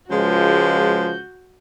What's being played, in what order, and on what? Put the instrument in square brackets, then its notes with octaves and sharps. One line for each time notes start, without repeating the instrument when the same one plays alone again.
[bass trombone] C#2 [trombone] F3 [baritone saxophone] G#3 [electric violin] F#4 G6